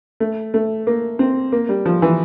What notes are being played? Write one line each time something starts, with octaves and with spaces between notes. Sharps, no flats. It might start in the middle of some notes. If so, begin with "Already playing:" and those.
A3
A3
A#3
C4
A#3
G3
F3
E3